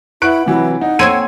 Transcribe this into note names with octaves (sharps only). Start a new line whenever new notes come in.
E4 B4 F#5 C#6 F#6 D7
C3 E3 F#3 E4
D#4 F#5
A#3 C4 C#5 G#5 E6 G#6 D#7